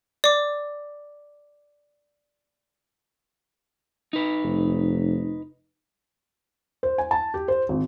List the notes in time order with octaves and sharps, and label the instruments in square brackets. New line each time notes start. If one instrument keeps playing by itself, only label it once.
[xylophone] D5 D6
[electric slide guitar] D#4 B4
[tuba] F1
[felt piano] C5
G#5
A5
G4
C5
G#1